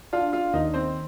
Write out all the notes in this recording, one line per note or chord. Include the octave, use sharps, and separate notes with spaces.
D4 F4 F5
F4 F5
D#2 D#4 D#5
C4 C5